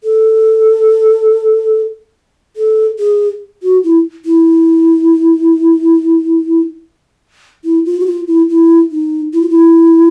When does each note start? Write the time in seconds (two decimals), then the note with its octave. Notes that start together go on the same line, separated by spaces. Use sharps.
0.04 A4
2.56 A4
2.99 G#4
3.63 F#4
3.84 E4
4.25 E4
7.64 E4
7.86 F4
8.00 F#4
8.06 F4
8.27 E4
8.49 E4
8.91 D#4
9.33 E4
9.41 F4
9.50 E4